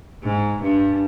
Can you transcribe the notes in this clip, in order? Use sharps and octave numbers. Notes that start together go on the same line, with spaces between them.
G#2
G2